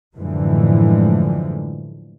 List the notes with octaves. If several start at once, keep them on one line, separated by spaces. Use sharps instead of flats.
F#2 A2 D3 E3 F3 G#3